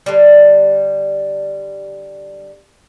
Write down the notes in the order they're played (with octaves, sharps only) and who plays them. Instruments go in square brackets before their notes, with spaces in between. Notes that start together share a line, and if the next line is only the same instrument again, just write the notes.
[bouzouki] D3 G3